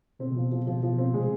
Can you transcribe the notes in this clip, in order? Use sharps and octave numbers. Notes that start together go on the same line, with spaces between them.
B2 C4
B2 F3
F3
B2
G#2 F3
B2 F3
B2 C4
C3 G#3